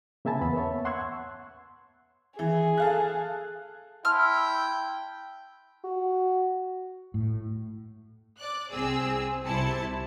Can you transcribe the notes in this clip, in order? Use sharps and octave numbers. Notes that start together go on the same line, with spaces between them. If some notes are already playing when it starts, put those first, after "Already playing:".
C#3 A#3 E5 G#5 A5 B5
E2 B3 B5
C#5 E5 A5
F#5 C6 C#6 E6 F#6 G#6
E3 G#4
A4 F5 F#6
E4 G5 A5 C6 E6 F6
F#4
A2
D5 F#6
C2 C4 G#4 E6
C2 C3 E4 C5 A5 C#7